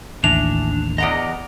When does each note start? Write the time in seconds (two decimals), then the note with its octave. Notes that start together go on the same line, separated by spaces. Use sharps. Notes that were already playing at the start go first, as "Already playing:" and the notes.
0.24 A1 D#2 E3 D4 F7
0.98 E2 D5 D#5 F#5 A#5